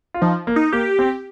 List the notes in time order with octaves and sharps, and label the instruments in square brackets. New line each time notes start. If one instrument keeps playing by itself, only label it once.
[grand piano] F4
[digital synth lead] F3 [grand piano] D#4
[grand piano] A#3
[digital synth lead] D#4
[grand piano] A#3 [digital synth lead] G4
[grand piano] C4